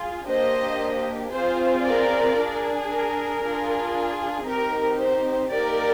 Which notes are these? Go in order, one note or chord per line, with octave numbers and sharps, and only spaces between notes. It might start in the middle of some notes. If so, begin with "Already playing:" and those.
Already playing: F4 G#4
A#3 D4 G4 C5 D#5
C4 F4 G#4 C5
A#4 D5
D4 G#4
A#4
D4 F4 G#4
C4 D#4 G4 A#4
C5
A#3 D#4 G4 A#4 D5